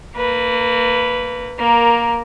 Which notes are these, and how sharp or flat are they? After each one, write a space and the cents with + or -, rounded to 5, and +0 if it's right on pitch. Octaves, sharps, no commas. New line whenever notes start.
A#3 -25 B4 +0
A#3 +10 A#4 +0